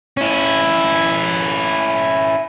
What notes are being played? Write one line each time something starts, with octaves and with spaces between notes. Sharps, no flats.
C#4 E4